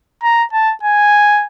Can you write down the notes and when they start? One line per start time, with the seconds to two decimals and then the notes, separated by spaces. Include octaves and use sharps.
0.23 A#5
0.53 A5
0.83 G#5